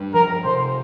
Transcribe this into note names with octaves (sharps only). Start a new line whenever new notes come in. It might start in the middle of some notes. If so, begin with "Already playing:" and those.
Already playing: G2
F3 A#4
C3 C5